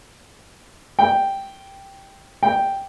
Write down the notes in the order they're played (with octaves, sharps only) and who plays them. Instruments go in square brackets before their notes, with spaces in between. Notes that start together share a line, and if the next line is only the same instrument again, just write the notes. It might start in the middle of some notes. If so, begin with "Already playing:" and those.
[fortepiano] G5
G5